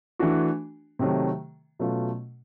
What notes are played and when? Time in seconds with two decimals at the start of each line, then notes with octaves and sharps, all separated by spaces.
0.19 E3 A3 D4 F#4
0.99 C3 D#3 F#3 A3
1.79 B2 F#3 A3 C#4 F4